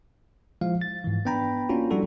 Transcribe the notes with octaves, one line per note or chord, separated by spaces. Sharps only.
F3 G#3 E4 F5
A6
G#2 E3
B3 D4 G5 A#5 B5
A#3 C#4 D4 F4 F#4
F3 G3 D4 E4 F#4 A4